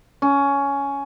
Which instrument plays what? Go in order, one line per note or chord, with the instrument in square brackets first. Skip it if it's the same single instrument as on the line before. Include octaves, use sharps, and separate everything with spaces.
[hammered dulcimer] C#4